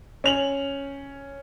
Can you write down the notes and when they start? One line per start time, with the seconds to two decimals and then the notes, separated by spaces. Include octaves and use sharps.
0.24 C#4 F7 F#7